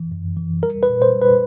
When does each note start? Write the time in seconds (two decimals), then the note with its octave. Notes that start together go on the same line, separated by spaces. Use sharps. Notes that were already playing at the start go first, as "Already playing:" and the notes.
Already playing: E3
0.12 F#2
0.37 E3
0.62 G3 A#4
0.83 B4
0.89 A#2
1.02 C5
1.15 G3
1.21 B4